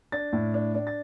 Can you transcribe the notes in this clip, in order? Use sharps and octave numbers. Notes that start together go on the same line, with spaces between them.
D4 A6
A2
D4
D4
A6